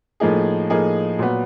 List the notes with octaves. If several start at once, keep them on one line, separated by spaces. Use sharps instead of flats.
A2 F3 A#3 D#4 G#4
A2 F3 A#3 D#4 G#4
A#2 F#3 B3